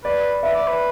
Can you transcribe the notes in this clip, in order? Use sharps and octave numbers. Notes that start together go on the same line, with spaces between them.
B4 D5
B4 E5
D5
B4